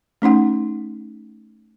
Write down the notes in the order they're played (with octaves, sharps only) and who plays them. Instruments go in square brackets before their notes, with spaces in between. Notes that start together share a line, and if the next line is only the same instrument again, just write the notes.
[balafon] A3 C#4 D#4 F#5